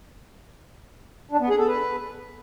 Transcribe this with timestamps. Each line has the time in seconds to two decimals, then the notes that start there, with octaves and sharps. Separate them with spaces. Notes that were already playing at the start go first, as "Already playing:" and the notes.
1.31 D4
1.40 B3
1.49 G#4
1.58 A4
1.67 B4